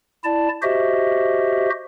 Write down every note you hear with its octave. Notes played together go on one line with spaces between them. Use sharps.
E4 D5 A5
F#4 G4 C5 D#5 E5